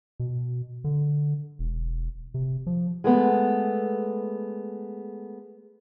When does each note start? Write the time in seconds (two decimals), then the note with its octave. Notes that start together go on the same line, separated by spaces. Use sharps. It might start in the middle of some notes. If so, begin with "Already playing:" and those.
0.20 B2
0.84 D3
1.59 E1
2.34 C3
2.67 F3
3.04 G#3 A3 B3